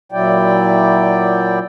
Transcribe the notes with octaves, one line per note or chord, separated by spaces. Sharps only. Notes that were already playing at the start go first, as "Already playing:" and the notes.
A#2 F#3 E4 D5 G5